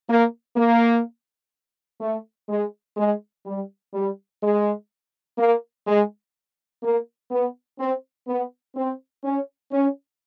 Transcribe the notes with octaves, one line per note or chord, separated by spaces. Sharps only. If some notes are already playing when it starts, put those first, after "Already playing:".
A#3
A#3
A3
G#3
G#3
G3
G3
G#3
A#3
G#3
A#3
B3
C4
B3
C4
C#4
C#4